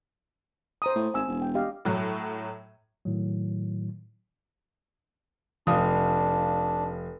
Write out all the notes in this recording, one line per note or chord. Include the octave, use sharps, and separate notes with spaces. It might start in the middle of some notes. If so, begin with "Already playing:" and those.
C5 A#5 D#6
A2
G#1 G#5 E6
E1
G5
G4 D#5 F5
A2 F#3
A2 D#3 F#3
F1 D4 F5 D#6